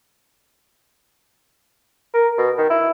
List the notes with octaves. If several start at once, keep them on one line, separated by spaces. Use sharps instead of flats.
A#4
B2
D#3
E4